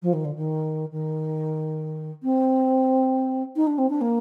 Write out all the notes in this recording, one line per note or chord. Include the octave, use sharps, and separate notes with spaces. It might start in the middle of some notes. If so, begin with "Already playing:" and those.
F3
D#3
D3
D#3
D#3
C4
D#4
D4
C4
D4
A#3